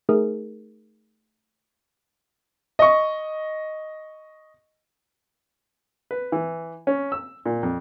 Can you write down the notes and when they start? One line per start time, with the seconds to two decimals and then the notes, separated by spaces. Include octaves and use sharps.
0.09 A3 D#4 G#4 A#4
2.79 D#5 C#6
6.11 B4
6.32 E3
6.87 C#4
7.12 E6
7.46 A#2
7.63 F2